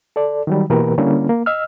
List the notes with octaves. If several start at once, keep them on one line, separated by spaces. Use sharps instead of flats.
A4 D5
D#3 F#3 G3
B2 E3 A#3 G4 A#4 B4
D3 G3 A#3 C#4 E4
A#3
D#5 E6 F6